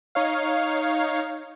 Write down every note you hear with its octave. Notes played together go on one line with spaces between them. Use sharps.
D#4 C#5 F5